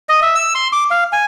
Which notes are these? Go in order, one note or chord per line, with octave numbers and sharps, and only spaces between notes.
D#5
E5
E6
C6
D6
F5
G#5